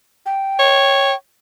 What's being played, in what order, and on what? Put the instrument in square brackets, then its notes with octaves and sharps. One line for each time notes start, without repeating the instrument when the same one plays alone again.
[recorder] G5
[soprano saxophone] C#5